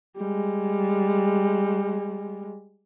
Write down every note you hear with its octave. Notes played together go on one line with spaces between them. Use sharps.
G3 G#3